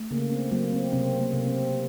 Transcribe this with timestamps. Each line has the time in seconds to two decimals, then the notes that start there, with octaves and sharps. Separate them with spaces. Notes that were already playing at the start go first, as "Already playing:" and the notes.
Already playing: A3
0.11 C#3 A#3
0.31 C4
0.52 F#3 A#3
0.73 C4
0.93 C3 C4
1.20 A#3
1.33 C3
1.47 C4